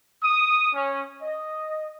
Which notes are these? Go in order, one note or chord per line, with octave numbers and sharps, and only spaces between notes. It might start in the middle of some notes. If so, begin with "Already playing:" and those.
D#6
C#4
D#5